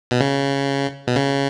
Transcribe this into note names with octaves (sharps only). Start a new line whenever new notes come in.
B2
C#3
B2
C#3